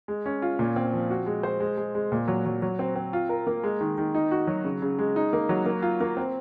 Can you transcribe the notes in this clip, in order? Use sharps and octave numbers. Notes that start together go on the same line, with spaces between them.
G#3
C#4
F4
A#2
C4
F3
F#4
G#3
C5
G#3
G#3
G#3
A#2
F#3
F#3
F#3
C4
C4
F4
A#4
A#3
G#3
D#3
D#3
D#4
F#4
F#3
C#3
C#3
G#3
D#4
A#3
F#3
A#3
F4
A#3
C4